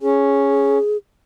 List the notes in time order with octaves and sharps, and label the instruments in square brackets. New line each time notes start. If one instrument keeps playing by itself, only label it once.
[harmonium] C#4 [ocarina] G#4